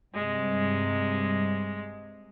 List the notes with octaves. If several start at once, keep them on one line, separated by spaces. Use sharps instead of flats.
G2 C3 G#3